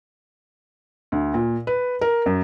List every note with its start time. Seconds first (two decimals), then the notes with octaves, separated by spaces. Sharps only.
1.12 D2
1.34 A#2
1.67 B4
2.01 A#4
2.26 F#2